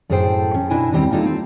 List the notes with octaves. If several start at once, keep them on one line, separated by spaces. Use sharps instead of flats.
F#2 A2 G#4 A4 C5 G5
C#4
B2 D4 E4 D#5 E5 G#5
D#2 G3 C4 C#4
A#3 D4 D#4 F4 A4
C4